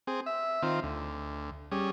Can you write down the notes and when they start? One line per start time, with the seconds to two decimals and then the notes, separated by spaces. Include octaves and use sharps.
0.07 C4 G#4
0.26 E5
0.63 D#3 C4 F4
0.83 D2
1.72 G3 C#4 G#4